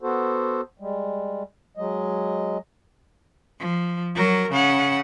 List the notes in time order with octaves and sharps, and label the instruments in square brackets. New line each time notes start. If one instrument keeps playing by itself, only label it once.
[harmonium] B3 F#4 A4 C5
G3 G#3
F#3 G#3 D#5
[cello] F3
F#3 A#4
C#3 F#5